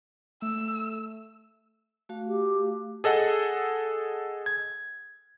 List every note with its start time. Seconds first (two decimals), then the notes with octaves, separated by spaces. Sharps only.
0.42 A3 E6
2.09 A3 F#4 F5
2.28 G4
3.04 G#4 A4 D#5 F#5
4.46 G#6